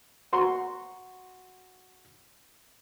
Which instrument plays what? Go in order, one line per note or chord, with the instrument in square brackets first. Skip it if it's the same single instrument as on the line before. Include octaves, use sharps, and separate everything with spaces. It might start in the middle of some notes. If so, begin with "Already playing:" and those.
[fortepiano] F#4 A#5 C6 C#6